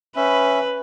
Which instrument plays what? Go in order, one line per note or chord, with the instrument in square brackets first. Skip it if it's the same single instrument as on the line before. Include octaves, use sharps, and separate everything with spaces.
[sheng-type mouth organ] C#4 E5 [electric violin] B4